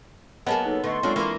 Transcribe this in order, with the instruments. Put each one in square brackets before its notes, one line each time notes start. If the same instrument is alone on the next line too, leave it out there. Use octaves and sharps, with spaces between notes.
[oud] F#3 A#3 G#4 [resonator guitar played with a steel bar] B3 [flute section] A#4 A5 [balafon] D#5
[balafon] D#4 B4 [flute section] A4
[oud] D3 A3 D#4 [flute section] A4 C6 C#6 [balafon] B4 D#5
[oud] F#3 [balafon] G#3 C4 F4 [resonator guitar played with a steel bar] A#3 D4
[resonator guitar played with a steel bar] E3 [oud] A#3 A#4